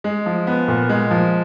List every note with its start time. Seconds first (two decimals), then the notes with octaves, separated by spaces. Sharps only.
0.04 G#3
0.26 F3
0.47 B3
0.68 A#2
0.89 G#3
1.11 F3